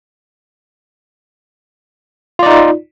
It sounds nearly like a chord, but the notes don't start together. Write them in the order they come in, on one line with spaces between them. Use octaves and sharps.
F4 D5 D#4